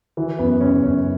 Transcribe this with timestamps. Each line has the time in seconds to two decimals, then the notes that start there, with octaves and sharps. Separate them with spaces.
0.17 E3 F#4
0.39 F#2 B3
0.60 C#3 C#4
0.83 F#2 C#4